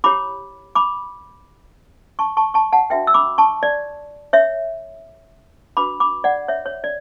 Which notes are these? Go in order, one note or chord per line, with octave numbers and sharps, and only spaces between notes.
E4 G4 C#5 B5 D6
B5 D6
A5 C#6
A5 C#6
A5 C#6
F#5 A5
D4 F#4 B4 E5 G5
E6
B5 D6
A5 C#6
D5
C#5 E5
D4 F#4 B4 B5 D6
B5 D6
D5 F#5
C#5 E5
C#5
D5